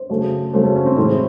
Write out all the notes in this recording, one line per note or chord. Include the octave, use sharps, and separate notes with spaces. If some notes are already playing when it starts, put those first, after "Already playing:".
Already playing: C5
C#3 F#3 A3
C#3 F#3 A3 C5
C#4
C#4
C4
A2 E3 G#3 C4